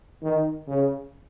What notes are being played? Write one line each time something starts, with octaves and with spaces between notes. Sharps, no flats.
D#3
C#3